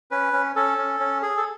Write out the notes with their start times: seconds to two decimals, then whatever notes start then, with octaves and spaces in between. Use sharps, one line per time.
0.11 C#4 B4
0.33 C#4
0.56 C#4 A4
0.78 C#4
1.00 C#4
1.22 G#4
1.37 A4